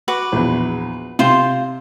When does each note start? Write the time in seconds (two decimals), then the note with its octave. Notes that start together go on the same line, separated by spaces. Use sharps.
0.08 F#4 B4 D6
0.32 A#1 E2
1.19 C3 F4 C5 C6